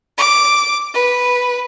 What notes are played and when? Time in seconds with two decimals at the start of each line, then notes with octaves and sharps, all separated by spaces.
0.17 D6
0.93 B4